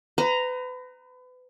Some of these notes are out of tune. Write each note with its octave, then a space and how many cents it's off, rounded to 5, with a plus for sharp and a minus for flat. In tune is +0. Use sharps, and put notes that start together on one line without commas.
B4 +35 A#5 +0